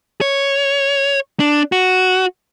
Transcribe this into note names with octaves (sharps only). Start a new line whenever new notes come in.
C#5
D4
F#4